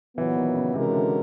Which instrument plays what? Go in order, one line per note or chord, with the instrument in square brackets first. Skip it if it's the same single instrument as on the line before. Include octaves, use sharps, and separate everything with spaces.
[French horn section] A#2 F#3 B3 [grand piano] E3
[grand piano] D#3
C#3
[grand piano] C3 [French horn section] E3 G#3 C#4 F#4 A#4
[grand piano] D3